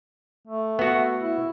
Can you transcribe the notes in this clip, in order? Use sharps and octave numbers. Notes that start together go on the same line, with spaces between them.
A3
B3 F#4
E4